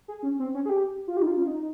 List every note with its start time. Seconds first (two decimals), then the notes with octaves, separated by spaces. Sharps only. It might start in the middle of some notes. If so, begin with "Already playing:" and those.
0.08 G#4
0.23 C#4
0.39 C4
0.54 C#4
0.65 G#4
0.69 G4
1.08 F4
1.17 G4
1.22 D#4
1.27 F4
1.37 C#4
1.42 F4
1.47 D#4